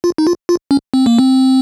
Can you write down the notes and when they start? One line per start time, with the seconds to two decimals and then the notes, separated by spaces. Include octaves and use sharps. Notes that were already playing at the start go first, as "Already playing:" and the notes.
0.04 F4
0.18 D#4
0.27 F4
0.49 F4
0.71 C#4
0.94 C4
1.06 A#3
1.19 C4